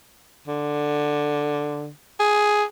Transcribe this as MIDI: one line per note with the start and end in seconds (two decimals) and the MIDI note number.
0.48 1.89 50
2.20 2.64 68